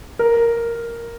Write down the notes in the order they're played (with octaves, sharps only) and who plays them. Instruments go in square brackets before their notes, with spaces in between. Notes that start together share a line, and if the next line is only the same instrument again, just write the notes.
[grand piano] A#4